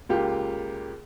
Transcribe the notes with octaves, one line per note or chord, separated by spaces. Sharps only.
C#2 A#3 F4 G4